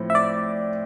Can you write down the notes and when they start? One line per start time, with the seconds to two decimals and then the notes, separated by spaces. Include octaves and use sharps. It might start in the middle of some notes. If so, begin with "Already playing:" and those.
Already playing: A2 F3 C4
0.10 E5
0.15 D5